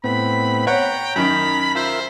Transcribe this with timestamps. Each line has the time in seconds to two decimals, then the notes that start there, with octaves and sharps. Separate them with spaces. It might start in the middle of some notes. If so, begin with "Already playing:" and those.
0.04 A2 B3 C4 B5
0.67 C#5 F#5 G5 A#5
1.16 F#2 D#3 B5
1.75 F4 A#4 C5 E5